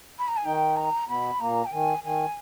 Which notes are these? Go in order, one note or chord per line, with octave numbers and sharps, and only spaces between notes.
B5
A#5
G#5
D#3 D#4 G5
A#5
B2 B3 B5
A#2 A#3 A#5
G5
D#3 G#5
D#3 G#5